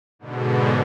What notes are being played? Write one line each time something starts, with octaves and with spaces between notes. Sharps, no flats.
G#2 B2 D3